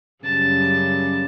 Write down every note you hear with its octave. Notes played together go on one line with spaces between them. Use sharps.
F#2 C#3 G3 A5